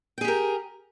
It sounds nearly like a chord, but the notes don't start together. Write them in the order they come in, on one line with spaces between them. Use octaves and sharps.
G5 G#4 G4 A#4